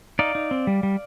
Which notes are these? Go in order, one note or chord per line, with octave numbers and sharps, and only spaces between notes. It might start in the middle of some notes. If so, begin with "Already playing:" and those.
D#4 D5 F5
D#4
C4
G3
G3